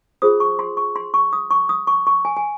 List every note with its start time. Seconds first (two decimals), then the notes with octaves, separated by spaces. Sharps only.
0.22 F4 G#4 C5 D#6
0.40 C#6
0.59 C6
0.77 C#6
0.96 C6
1.14 C#6
1.33 D#6
1.51 C#6
1.69 D#6
1.87 C#6
2.07 C#6
2.25 G#5
2.37 G#5